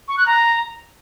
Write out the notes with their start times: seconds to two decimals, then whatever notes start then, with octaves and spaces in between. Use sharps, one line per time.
0.08 C#6
0.17 F#6
0.26 A#5